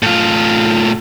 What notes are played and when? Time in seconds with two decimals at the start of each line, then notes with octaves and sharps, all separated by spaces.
0.03 A2 F4